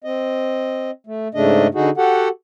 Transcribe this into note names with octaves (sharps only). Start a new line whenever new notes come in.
C4 D#5
A3
G#2 C#3 A3 D4 D#5
D3 D#4 F#4 G#4
F#4 G4 A4 F#5